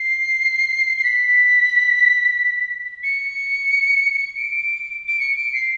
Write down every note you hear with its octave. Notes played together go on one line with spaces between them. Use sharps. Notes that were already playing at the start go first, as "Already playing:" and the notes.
Already playing: C7
C7
B6
C#7
C#7
D7
D7
C#7
D7
C7